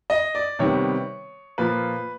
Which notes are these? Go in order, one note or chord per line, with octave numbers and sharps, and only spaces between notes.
D#5
D5
C3 D#3 G3 B3 C#5
A#2 F3 A#3 B4